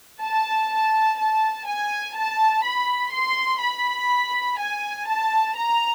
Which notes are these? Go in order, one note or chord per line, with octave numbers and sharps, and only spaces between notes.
A5
A5
G#5
A5
B5
C6
B5
G#5
A5
A#5